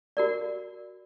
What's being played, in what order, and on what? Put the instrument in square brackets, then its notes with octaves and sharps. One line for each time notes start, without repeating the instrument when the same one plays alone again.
[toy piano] F#4 A#4 D5